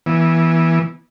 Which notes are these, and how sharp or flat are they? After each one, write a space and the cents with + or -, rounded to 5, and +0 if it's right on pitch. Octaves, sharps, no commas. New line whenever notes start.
E3 +0 B3 -25